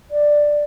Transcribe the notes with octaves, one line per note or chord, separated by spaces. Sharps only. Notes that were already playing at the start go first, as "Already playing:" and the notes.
D5